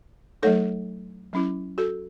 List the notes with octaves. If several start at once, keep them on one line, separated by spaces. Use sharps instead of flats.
F#3 A3 D#4 A4 C#5
F#3 C#4 E4
F#4 A4